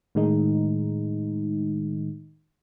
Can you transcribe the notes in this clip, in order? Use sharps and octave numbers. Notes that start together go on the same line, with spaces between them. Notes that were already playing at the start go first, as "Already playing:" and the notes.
A2 D#3 G#3 D#4